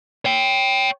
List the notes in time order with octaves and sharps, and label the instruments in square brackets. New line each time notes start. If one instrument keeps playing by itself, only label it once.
[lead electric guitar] C#5 G5